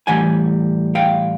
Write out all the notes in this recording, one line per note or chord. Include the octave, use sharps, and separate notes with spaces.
A2 E3 G3 F#5 G#5
F5 G5